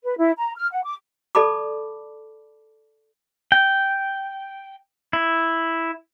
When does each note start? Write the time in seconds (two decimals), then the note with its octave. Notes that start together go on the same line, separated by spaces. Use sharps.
0.04 B4
0.18 E4
0.37 A#5
0.57 F6
0.71 F#5
0.84 D6
1.35 A4 D5 A5 B5 D6
3.52 G5
5.13 E4